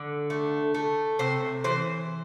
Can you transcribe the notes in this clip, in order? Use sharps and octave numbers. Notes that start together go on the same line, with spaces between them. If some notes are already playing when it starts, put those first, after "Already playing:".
Already playing: D3
A3
A3
C3 C5
E3 C5